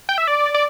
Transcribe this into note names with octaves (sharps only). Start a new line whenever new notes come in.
G5
E5
D5
D5